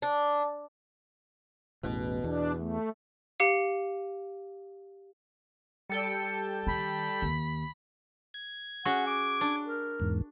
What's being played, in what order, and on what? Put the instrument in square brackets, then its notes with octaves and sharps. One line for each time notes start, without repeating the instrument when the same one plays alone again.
[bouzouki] D4
[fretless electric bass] A1 E2 [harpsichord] B2
[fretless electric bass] E2 [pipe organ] D4
[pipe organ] A3
[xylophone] G4 F5 C#7
[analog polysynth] G3 A4 G5 [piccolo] C#7
[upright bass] D#3 [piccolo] B5
[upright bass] D#2
[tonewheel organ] G#6
[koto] C#4 F#4 G#4 [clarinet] F#5
[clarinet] D6
[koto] D4
[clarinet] A#4
[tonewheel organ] E2 G#2